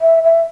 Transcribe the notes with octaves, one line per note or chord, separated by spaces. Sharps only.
E5
E5